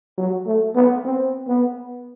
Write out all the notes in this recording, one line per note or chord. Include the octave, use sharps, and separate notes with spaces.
F#3
A3
B3
C4
B3